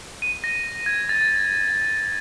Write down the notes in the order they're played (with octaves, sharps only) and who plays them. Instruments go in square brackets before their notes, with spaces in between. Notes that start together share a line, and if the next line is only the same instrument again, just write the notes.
[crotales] D#7
A#6
G#6
A6